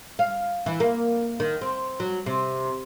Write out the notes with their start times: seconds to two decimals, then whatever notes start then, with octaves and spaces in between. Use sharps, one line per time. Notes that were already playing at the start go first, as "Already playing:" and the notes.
0.19 F5
0.66 E3
0.80 A#3
1.40 D#3
1.61 C4
2.00 F#3
2.26 C3